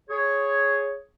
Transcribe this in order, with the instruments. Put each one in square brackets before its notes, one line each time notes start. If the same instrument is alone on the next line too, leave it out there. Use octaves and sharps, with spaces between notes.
[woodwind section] G#4 C#5